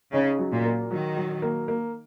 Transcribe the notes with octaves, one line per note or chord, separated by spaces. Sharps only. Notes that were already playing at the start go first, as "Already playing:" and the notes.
C#3 D#4
F#3
A#2
A#3
D#3 F#3
F#3
A#3
A#3